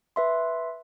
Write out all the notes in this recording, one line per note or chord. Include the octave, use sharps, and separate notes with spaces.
B4 E5 C6